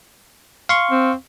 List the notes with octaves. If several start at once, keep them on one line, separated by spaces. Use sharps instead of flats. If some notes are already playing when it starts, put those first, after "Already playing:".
F5 C6 C#6
C4